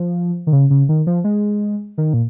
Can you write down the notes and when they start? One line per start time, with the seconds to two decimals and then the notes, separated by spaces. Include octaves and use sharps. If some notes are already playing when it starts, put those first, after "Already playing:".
Already playing: F3
0.47 D#3
0.53 C#3
0.70 C#3
0.89 D#3
1.07 F3
1.24 G#3
1.98 D#3
2.14 A#2